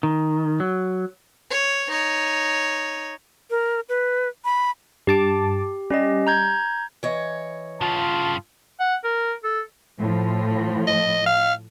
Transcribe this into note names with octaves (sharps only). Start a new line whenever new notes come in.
D#3
F#3
C#5
D#4 C#5
A#4
B4
B5
G2 G4 A5 D6
G3 C#4 G4 D#5
A#5 G6 G#6
E3 C#5 D#5
G2 C#3 F4 A5
F#5
A#4
A4
A2 F3
D#5
F5